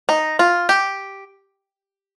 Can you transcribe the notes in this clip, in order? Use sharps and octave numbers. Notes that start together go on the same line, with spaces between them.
D#4
F4
G4